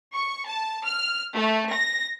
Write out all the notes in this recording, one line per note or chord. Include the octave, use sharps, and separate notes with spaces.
C#6
A5
F6
A3
A#6